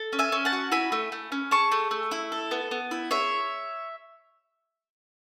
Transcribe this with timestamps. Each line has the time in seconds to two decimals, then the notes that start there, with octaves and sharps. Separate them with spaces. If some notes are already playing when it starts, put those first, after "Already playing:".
Already playing: A4
0.13 C#4
0.19 E5 G#5
0.32 C#4
0.45 F#5 A5
0.53 F#4
0.72 E4 G#5 B5
0.92 A3
1.12 A3
1.32 C#4
1.51 G#4 A5 C#6
1.72 A3
1.91 A3
2.11 E4
2.32 A4
2.51 B3
2.71 B3
2.91 E4
3.11 G#4 C#5 E5